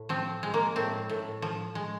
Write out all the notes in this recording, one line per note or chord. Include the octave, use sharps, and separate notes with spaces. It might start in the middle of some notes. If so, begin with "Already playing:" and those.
Already playing: A2
F3 C4
G#3
A#3
A2 C4
A2
F3
G#3